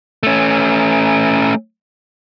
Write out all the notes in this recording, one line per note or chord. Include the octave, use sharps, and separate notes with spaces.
A3 C#4